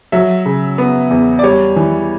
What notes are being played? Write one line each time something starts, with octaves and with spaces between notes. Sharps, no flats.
F#3 E5
C#3
B3
E2
D5
G3 C#5
E3